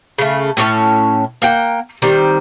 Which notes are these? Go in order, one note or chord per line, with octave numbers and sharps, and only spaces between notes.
C#3 A3
A2 C#4 C#5 A5
A#3 F#5 G5
D#3 G3 C4